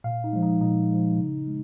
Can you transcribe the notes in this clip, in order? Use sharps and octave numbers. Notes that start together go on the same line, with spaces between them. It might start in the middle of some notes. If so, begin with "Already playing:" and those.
A#2 F5
D#4
F3 G#3
D#4
A#2 D#4
F3 G#3
C#3
G#3